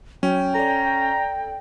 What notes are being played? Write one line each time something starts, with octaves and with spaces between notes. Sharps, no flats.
F#3 C#4 G5
A4 D5 A#5